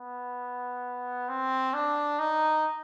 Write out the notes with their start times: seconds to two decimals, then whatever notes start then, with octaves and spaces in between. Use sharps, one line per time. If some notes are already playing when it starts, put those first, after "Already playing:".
Already playing: B3
1.29 C4
1.74 D4
2.19 D#4